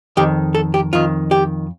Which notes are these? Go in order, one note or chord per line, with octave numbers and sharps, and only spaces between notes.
F2 D#3 G4
A4
G4
F2 D#3 F4
G4